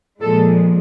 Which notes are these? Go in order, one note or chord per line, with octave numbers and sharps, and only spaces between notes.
A#2 F3 G#3 A4